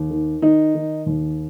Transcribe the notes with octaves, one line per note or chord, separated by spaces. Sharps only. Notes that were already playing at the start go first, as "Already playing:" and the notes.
Already playing: D#2
D#3
D#3 D#4
D#3
D#2